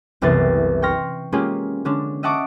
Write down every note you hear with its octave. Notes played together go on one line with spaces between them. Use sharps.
F#1 C2 E3 B3 A6 C7
G5 C6 C#6 F6 A#6
G#3 A#3 C#4 F4 G4 G#4
D3 G#3 C#4 D4
D#5 E5 F#5 A5 C#6 D6